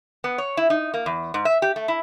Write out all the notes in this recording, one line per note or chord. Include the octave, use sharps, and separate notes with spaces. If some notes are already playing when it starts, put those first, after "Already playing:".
B3
C#5
E4
D#4
A#3
E2
G#2
E5
G4
A3
E4